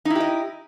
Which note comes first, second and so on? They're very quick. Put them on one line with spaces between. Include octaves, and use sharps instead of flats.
D#4 E4 G4 D#5